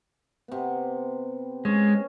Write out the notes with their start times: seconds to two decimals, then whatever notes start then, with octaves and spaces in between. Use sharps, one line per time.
0.48 C3 B3
1.65 G#3 C#4